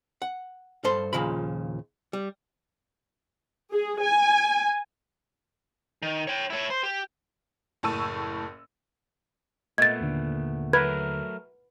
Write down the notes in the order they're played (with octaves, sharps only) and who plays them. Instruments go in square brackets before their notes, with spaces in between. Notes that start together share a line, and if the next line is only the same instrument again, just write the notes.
[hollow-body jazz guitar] F#5
G2 A4 C5 C6
D#2 A#2 C#3 F3 B5
G3
[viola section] G#4
G#5
[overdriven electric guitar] D#3
C#5 G5
E4 C#5
C5
G4
[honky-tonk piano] F#1 A2 A5 C#6 E6 D#7
[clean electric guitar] A#2 A3 B3 [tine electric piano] D#5 [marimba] G#6 A6
[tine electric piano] D#2 D3
[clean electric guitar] F#3 A3 A#4 [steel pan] B4 [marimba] G#6